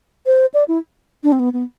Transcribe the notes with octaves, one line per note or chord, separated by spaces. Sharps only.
C5
D5
E4
D4
C4
B3
B3